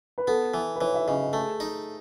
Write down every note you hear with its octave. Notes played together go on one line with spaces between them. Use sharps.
B4
B3 A4
E3
B4
E3 C#5
E5
C#3 D#5
D#5
A3 G#4
D#4